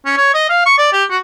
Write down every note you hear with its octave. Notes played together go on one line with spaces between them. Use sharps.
C#4
C#5
D#5
F5
C#6
D5
G4
F#4